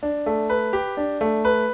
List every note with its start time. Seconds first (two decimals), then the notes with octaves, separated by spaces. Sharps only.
0.03 D4
0.26 A3
0.49 B4
0.73 G4
0.97 D4
1.21 A3
1.45 B4